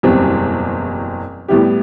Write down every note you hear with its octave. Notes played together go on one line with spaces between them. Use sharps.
F#1 E2 B2 G3 C4
A2 G3 B3 E4 G4